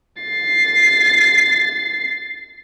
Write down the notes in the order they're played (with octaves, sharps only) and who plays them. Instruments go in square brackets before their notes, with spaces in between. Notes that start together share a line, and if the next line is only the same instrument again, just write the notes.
[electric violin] A6 C7